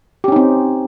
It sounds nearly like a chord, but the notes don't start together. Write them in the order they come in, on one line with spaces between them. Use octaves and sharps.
G4 C#4 D#4 C4